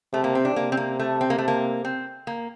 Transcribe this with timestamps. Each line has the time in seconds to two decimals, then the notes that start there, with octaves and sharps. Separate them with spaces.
0.13 C3 A3
0.24 A#3
0.35 C4
0.45 D4
0.56 C3 A#3
0.72 C4
0.77 A#3
0.99 A3
1.21 C4
1.30 A#3
1.38 A3
1.48 A#3
1.85 C4
2.27 A#3